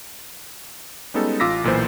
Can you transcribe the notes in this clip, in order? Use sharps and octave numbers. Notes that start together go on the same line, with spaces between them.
G3 G#3 B3 C#4 D#4 A4
A1 F4 D6 E6 A#6 B6
B1 A#2 E3 C5